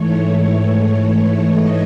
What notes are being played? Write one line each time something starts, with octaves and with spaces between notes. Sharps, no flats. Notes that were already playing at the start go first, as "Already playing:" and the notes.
Already playing: G#2 E3 A3 C#5
D#5